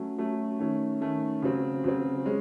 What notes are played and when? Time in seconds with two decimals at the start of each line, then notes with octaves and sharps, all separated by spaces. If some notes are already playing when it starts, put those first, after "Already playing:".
Already playing: F#3 A3 C#4
0.18 F#3 A3 C#4
0.59 D#3 A3 C#4
1.01 D#3 A3 C#4
1.42 C#3 F#3 C4
1.84 C#3 F#3 C4
2.25 G#3 C#4